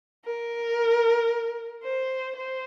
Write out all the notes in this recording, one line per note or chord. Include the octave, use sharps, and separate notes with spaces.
A#4
C5
C5